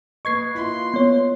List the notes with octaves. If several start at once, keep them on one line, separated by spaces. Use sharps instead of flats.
A#3 B4 D#5 C#6 G#6 C7
E4 F4 C6
B3 C#5